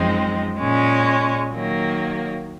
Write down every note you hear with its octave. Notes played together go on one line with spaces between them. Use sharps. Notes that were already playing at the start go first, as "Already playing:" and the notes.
Already playing: F#2 F3 G#3 C4 D#4
A#2 G#3 C#4
D#3 F#3 A#3